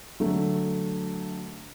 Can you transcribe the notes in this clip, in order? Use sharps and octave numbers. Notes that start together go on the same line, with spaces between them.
D3 F#3 A3